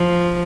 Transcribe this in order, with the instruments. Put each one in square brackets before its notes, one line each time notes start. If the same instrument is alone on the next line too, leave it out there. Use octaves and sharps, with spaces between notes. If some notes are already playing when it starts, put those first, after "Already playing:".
Already playing: [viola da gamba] F3